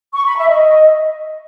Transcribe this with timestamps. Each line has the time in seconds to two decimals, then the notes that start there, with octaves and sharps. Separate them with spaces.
0.14 C#6
0.25 B5
0.37 E5
0.49 D#5